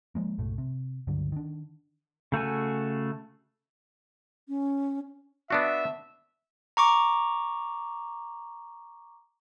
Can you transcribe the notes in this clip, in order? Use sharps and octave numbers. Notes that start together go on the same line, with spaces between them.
F3 G#3 A#3
B1 F#2 A2 A3
C3
C#2 G2 D3 F#3
D#3 D4
C#3 A3 F#4 G#5
C#4
B3 D4 F#4 E5
A#5 C#6 D6